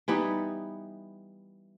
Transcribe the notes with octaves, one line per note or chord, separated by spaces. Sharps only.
E3 G3 B3 D#4